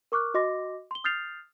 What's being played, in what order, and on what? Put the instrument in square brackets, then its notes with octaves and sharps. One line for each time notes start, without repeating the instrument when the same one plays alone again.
[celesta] A#4 C#6 D6 F6 F#6
F#4 D#5 C6 D6 A#6
C6 G7
D#6 F6 G6 A6 C7 F7